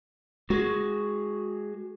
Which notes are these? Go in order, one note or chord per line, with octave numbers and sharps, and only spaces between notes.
G#3 F#4 G#4